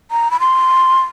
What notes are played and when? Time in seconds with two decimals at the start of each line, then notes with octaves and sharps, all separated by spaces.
0.11 A#5
0.31 B5
0.40 C6